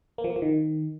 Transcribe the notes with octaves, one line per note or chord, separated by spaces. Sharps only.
A#3
F3
A#3
F3
D#3